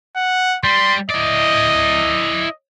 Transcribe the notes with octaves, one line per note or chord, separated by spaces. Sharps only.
F#5
G3 C6
E4 D5 D#5